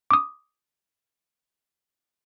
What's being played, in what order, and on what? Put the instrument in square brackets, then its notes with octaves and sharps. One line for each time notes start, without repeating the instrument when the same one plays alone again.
[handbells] D6 D#6